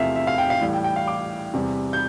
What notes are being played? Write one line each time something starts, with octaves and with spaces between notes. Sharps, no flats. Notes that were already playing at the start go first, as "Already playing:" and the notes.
Already playing: E2 C3 F3 A3 E5 F5
E5
F5
G5
F5
A2 E3 G3
G5
G5
F5
D6
E2 C3 G3
G6